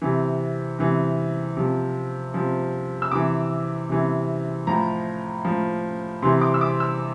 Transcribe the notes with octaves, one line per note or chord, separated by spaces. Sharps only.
C3 E3
C3 E3
C3 F3
C3 F3
E6
C3 E3 D6
C3 E3
A2 F3 A#5
A2 F3
C3 E3 C6
D6
E6
D6
E6